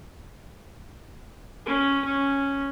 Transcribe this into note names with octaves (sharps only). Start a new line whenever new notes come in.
C#4
C#4